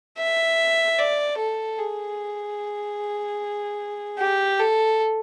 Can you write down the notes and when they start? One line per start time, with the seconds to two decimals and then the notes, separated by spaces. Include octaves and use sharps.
0.18 E5
0.98 D5
1.38 A4
1.78 G#4
4.19 G4
4.59 A4